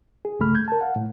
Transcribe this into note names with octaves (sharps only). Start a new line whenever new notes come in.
G#4
C2 G2 C#3 A3 B5 F6
G6 G#6
A#4 A5
F5 F#5
A2